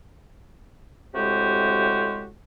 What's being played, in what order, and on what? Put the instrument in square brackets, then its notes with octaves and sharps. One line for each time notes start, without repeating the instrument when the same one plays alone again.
[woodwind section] A2 C3 G#3 F#4 G4